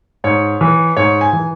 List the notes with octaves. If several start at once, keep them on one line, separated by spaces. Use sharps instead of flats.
G#2 C#5
E3
G#2 C#5
G#5
E3